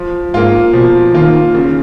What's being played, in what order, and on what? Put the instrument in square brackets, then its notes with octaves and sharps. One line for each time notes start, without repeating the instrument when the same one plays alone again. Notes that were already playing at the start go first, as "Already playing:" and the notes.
Already playing: [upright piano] F3
[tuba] G#2 [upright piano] A#3 F4
[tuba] B2 [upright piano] F3
[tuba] D#3 [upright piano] A#3 F4
[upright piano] C#3